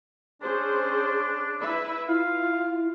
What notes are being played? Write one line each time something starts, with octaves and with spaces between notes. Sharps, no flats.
C#4 D4 G#4 C5
E4 B4 E5 B5
E4 F4 F5